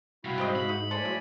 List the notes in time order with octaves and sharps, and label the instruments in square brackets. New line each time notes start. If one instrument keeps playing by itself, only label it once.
[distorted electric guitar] C3 G3 [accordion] E4 F#4 F5
[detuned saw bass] G#2 [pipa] G4 C5 D#5
[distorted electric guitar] B5
[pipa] D#4
[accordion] A2 D5 G#5 [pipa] A4 C5
[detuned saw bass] F#3 [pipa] E4